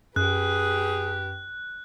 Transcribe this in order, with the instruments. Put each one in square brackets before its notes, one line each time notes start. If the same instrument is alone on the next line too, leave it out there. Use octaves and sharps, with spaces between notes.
[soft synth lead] F#2 [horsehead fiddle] G4 B4 [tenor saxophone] G#4 [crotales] F#6